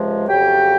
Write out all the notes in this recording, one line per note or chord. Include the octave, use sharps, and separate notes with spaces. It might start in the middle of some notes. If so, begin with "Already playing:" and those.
Already playing: C#2 C3 F3 G#3
F2 C#3 F#3 G4 G5